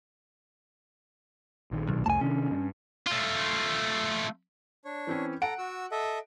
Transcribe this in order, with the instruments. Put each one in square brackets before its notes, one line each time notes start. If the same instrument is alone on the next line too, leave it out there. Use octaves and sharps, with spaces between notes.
[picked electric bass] A#1 D#3
[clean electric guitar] B1
[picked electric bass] C2 F2 A3 [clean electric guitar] G#5 A5
[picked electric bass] C3 D#3 D4 [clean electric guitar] C#4
[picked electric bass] G2
[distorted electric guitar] A3 F4
[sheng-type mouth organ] D4 C#5
[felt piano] E3 C4 C#4
[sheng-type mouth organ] A4 A#5 [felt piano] F#5 D7
[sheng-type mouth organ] F#4 E6
A4 D#5 E5